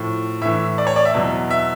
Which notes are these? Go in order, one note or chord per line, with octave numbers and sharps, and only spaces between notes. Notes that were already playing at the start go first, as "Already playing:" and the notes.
Already playing: A2 F3
A2 E3 E5
D5
C#5
D5
E5
E2 B2 F#3
E5